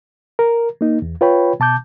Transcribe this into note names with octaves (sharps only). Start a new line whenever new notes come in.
A#4
A#3 D#4
E2
F4 B4 C#5 G5 B5
B2 A5 D6 G6